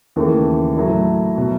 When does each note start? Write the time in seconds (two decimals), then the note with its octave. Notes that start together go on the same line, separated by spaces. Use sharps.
0.16 D#2 C#3 E3 A3
0.77 A2 F#3 A3 E4
1.36 B2 F#3